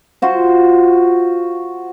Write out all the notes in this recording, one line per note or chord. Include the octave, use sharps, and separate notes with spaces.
F4 F#4 C5